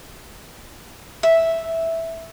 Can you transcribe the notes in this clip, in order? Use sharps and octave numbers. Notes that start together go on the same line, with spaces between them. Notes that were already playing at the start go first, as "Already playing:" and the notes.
E5